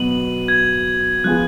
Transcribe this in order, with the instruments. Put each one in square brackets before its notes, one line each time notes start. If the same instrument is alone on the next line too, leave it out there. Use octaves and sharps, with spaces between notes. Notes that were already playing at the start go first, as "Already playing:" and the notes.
Already playing: [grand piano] B2 F#3 B3 F#4 [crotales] D#7 F#7
[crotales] G#6
[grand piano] F3 B3 F4 G#4 [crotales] F#6